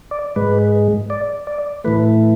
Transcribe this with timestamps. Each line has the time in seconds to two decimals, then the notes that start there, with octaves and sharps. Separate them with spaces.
0.11 D5
0.36 G#2 G#3 B4
1.10 D5
1.47 D5
1.84 A2 E3 A3 B4